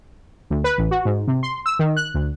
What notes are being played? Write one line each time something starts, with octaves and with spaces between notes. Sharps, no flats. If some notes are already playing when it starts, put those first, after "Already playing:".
D2
B4
A1
F#4
G#2
C3
C6
E6
D#3
F#6
D2